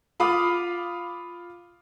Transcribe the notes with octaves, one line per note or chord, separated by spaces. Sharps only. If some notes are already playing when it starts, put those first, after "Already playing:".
F4 F5 B5 D6 D#6